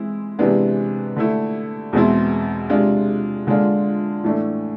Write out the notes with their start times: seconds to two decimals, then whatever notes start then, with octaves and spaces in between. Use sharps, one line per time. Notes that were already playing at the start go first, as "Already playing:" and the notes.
Already playing: E3 G#3 C4 E4
0.39 C3 E3 G#3 B3 D4
1.16 D3 A3 E4
1.93 E2 B2 G#3 C4 E4
2.70 C3 G#3 D4 F4
3.47 D3 G#3 D4 F4
4.24 A2 E3 A3 D4